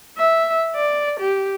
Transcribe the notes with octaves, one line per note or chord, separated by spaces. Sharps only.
E5
D5
G4